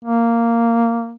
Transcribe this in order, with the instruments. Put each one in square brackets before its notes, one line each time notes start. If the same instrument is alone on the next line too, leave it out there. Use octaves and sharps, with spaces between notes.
[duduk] A#3